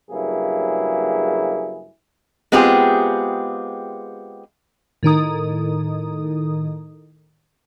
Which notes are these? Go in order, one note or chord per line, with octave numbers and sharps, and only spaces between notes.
G2 C#3 F#3 A#3 E4 G#4
G#3 B3 C4 F4 G4 G#4
A2 D#3 D#4 D#6